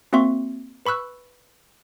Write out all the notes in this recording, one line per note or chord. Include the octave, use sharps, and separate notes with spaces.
A#3 C4 F#4 E5 C6 C#6
B4 B5 C#6 E6 F#6